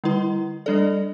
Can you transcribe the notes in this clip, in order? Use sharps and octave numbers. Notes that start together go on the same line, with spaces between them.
D3 G3 E4 B4
G3 D4 A4 D5